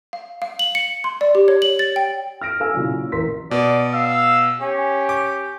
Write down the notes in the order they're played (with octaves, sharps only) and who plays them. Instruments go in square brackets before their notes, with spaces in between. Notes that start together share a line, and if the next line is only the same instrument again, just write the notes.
[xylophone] F5
F5
F#7
C#7
C6
D5
G4
C#5
F#7
A6
G5
[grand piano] F6 A#6 D7
A4 F5 G#5 E6
A#2 C#3 F#3 C#4 E4
A1 A#4 C6 B6
[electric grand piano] B2 [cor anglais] D5
[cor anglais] F5 [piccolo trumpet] E6
[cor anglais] C#4 [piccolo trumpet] G4
[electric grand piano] D6